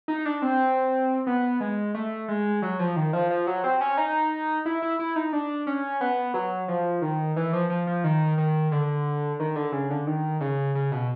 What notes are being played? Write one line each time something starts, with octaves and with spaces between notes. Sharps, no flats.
D#4
D4
C4
B3
G#3
A3
G#3
F#3
F3
D#3
F3
F3
F#3
C4
C#4
D#4
E4
E4
E4
D#4
D4
C#4
B3
F#3
F3
D#3
E3
F3
F3
F3
D#3
D#3
D3
D#3
D3
C#3
D3
D#3
C#3
C#3
B2